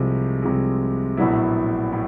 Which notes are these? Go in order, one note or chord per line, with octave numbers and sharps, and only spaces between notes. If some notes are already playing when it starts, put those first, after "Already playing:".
Already playing: C2 C3 F3 G#3
C2 C3 F3 G#3
A#1 A2 F#3 B3 E4
A2